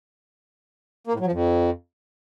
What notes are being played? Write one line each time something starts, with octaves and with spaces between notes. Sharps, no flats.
A#3
A2
F#3
F3
F2